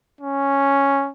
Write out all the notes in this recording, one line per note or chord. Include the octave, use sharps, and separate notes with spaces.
C#4